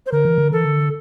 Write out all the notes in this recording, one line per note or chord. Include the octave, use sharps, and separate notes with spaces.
C5
D3 A#4
E3
D3
E3 A4
D3